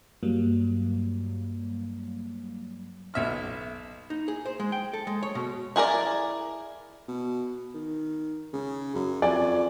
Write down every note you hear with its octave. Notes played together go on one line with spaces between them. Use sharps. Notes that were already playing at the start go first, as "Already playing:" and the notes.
G2 F#3 G3 A#3
B1 E5 F6
D#4
G#4
C5
G#3
G5
A4
G#3
C#5
B2
E4 G#4 A#4 D5
B2
D#3
C#3
F#2
F2 D5 G#5